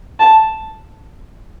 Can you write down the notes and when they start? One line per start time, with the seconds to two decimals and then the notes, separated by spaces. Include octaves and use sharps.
0.20 A5